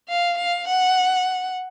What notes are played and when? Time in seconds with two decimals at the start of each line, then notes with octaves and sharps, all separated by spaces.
0.09 F5
0.38 F5
0.68 F#5